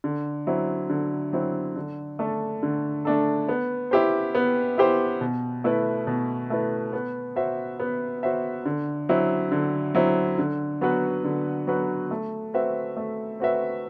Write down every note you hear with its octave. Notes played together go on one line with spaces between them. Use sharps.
D3
F#3 C4 E4
D3
F#3 C4 E4
D3
A3 D4 A4
D3
A3 D4 A4
B3
E4 G4 C5
B3
E4 G4 C5
B2
A3 E4 B4
B2
A3 E4 B4
B3
F#4 C5 E5
B3
F#4 C5 E5
D3
F#3 C4 E4
D3
F#3 C4 E4
D3
F#3 B3 F#4 B4
D3
F#3 B3 F#4 B4
A3
C4 F#4 B4 E5
A3
C4 F#4 B4 E5